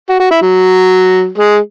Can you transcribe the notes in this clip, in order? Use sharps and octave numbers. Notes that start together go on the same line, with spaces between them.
F#4
F#4
E4
F#3
G#3